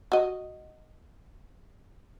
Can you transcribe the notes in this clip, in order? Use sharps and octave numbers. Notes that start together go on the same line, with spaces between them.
F#4 D#5